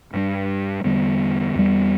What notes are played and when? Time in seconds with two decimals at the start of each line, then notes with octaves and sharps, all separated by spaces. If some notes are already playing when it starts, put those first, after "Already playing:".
0.14 G2 G3 D4
0.84 E2 D3 G3 B3
1.55 E2 E3 G3 B3